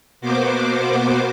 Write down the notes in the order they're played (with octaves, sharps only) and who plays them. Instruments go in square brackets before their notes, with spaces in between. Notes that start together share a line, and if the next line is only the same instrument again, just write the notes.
[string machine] B2 A#3 B3 F#4 C5 D6